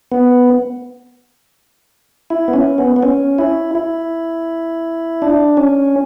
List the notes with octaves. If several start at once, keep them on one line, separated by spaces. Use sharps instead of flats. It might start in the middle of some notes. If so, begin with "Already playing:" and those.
B3
E4
B3
C#4
B3
B3
C#4
E4
E4
D4
C#4